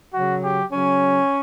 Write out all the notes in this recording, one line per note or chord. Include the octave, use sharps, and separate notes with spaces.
C#3 F#3 F#4
G4
C#3 F#3 C#4